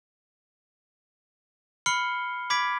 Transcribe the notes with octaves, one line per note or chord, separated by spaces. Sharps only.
B5 F6 C7 C#7 G7
B5 D6 G#6 B6 D7